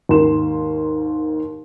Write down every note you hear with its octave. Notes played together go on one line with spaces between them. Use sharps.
D#2 G#2 D#3 A#4 C6 E7